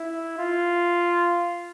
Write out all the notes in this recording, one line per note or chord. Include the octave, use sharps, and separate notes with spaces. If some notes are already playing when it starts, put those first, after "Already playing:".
Already playing: E4
F4